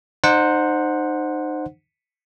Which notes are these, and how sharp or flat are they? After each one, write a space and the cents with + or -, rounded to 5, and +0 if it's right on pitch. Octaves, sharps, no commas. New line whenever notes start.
D#4 -30 C5 +0 F#5 -10